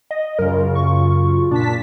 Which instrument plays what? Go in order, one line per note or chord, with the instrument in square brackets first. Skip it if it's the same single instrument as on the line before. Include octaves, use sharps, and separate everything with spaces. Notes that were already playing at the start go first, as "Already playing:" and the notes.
[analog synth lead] D#5
[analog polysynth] F#2 C#3 F4 [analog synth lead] A#4
[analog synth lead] C#6
[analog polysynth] A#2 A5 B6 [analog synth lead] D4